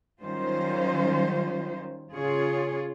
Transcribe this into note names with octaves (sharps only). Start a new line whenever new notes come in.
D#3 F#3 G3 C#4 F4 C5
C#3 F4 G#4 C#5